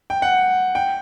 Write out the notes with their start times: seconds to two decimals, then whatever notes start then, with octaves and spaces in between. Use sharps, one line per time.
0.10 G5
0.22 F#5
0.75 G5